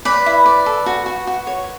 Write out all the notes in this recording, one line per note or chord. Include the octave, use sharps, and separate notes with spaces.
B4 D5 B5
E4
D5
A4
F#4
F#4
F#4
C#5